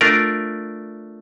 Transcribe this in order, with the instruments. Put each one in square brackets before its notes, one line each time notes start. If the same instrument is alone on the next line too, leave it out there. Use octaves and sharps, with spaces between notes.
[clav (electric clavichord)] A3 D4 F4 A#4 D5